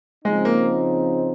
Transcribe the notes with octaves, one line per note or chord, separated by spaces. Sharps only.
C#3 F3 G#3 C4 D#4
A#3